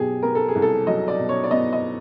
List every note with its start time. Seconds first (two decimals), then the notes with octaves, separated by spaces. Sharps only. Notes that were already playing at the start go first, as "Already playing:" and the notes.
Already playing: B2 F#3 G4 G#4
0.23 B3 A#4
0.35 A4
0.48 G#4
0.55 C2
0.62 A4
0.87 F#3 D#5
1.08 D5
1.19 B2
1.29 C#5
1.44 D5
1.51 B3 D#5
1.73 D#5